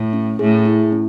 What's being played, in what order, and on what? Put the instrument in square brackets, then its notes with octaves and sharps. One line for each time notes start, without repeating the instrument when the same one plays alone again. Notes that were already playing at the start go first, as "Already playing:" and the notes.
Already playing: [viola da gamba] A2
[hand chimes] C#4
[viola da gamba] A2 [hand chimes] G#4
[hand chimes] E4
C#4